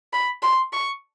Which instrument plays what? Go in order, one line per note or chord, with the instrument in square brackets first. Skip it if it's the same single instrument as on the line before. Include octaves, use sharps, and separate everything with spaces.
[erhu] B5
C6
C#6